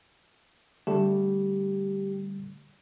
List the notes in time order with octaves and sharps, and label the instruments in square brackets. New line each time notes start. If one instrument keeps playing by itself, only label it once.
[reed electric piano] D3 G3 A3 [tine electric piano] G4